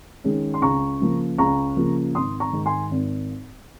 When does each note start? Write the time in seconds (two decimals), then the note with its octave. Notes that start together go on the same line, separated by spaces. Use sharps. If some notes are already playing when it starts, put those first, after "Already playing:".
0.24 D#3 G#3 C#4
0.54 C6
0.62 C#2 A#5 C#6
1.00 C#3 F3 A#3
1.38 C#2 A#5 C#6
1.77 C#3 F3 A#3
2.15 G#1 C6 D#6
2.40 A#5 C#6
2.53 G#2 D#3
2.66 G#5 C6
2.91 G#1